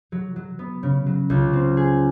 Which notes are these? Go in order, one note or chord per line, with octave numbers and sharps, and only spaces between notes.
F#3
F#3
B3
C#3
F#3
C#2
C4
G#4